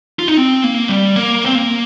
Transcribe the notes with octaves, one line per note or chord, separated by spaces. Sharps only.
F4
D#4
C4
A#3
G3
A#3
C4
A#3